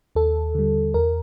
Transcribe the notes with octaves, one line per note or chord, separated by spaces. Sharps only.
D#2 A4
D3 G3
E2 A#4